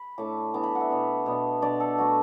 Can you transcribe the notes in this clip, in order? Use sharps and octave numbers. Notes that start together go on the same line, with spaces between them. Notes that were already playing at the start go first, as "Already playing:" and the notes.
Already playing: B5
A2 A3 D4 D6
E3 B3 D4 D6
B5
F#5
E5
B2 B3 D4
B2 B3 D4
B2 B3 D4 D5
A4
B2 A3 D4 F#4